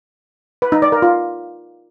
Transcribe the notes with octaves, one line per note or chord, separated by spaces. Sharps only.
B4
D#4
D5
A#4
F4